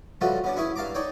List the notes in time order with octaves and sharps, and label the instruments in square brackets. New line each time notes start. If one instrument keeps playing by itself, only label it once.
[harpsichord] C#3 F3 G3 A3 F#4 B4
B3 C#4 D4
C#4 E4 G#4 B4 C#5
G2 F5 A5 A#5 D6
D#4 C#5 D5 G5